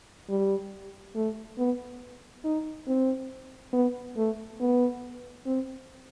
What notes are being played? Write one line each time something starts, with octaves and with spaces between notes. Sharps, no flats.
G3
A3
B3
D#4
C4
B3
A3
B3
C4